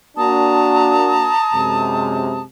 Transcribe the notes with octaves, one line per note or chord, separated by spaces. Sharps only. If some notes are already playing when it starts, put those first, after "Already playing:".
A#3 D4 F#4 A5 A#5 D#6
F#2 C3 G#3